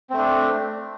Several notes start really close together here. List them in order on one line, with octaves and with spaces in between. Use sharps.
C4 A3 D4